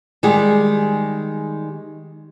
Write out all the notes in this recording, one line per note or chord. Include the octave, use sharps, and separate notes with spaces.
D#3 G3 G#3 G#4